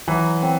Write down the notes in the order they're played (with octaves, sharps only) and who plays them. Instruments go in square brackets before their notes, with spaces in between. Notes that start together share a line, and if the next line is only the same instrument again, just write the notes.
[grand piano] E3 [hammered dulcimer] F#3
[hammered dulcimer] C4